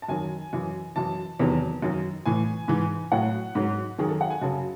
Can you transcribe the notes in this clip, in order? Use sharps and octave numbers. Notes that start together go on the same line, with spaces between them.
A5
F#2 D#3 F#3 G#5
F#2 E3
F#2 E3 A5
E2 C3 D#3 F#3
F#2 D#3 F#3
A2 E3 G#5
G#2 E3
A2 F#3 F#5
G#2 F#3
F#2 D#3 F#3 G#4
A4
F#5
G#5
F#2 C#3 F#3 A5